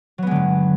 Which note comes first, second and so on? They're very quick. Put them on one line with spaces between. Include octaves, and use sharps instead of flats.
F#3 B3 G#3 D3 G2